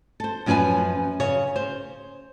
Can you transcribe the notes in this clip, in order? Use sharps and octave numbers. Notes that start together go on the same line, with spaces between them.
A4 C5
F#2 F3 C#4 G#4 B4 G#5
C#3 C#5
C5